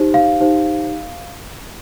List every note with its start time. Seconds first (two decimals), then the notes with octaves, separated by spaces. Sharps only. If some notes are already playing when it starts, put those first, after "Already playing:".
Already playing: D#4 G4 C5
0.14 F5
0.40 D#4 G4 C5